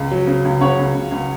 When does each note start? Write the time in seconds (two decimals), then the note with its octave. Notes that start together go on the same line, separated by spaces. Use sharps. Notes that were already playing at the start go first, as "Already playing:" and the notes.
Already playing: C#2
0.11 F#3
0.27 C#3
0.45 C#2
0.61 C#3 C#5 F#5
0.78 C#2
0.94 C#2
1.12 C#2